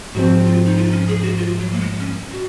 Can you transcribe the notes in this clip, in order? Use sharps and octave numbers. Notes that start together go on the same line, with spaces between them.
G#2 F3 C4 F#4
F4
D#4
F4
C#4
G#4
F#4
F4
F#3
A#3
G#3
C#4
F#4